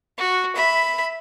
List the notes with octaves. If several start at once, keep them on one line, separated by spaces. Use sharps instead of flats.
F#4
E5 B5